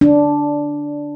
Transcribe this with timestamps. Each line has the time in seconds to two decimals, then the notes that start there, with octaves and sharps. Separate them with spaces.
0.01 D4